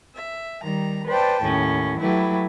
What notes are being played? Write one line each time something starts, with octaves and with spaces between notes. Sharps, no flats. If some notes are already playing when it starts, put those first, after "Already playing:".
E5
D#3 G3 A#5
B4 C5 D5 G5 A5
D#2 A2 C#4
F#3 A3 E4 G4 B4